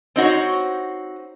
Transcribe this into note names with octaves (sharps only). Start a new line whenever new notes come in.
C4 D#4 F#4 C#5